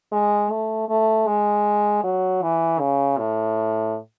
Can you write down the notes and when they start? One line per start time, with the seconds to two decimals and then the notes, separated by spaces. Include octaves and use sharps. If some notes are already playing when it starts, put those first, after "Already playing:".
0.12 G#3
0.50 A3
0.89 A3
1.27 G#3
2.03 F#3
2.42 E3
2.80 C#3
3.18 A2